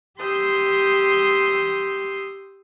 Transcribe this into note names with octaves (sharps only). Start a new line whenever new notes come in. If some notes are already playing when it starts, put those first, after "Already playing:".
G4 C6 D#6 E6 G6